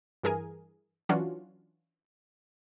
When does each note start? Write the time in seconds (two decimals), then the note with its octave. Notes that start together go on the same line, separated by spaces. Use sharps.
0.23 G2 E3 G#4 A#4 G#5
1.09 E3 F#3 C#4 D4 F4 F#4